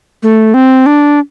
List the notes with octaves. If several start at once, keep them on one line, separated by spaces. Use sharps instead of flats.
A3
C4
D4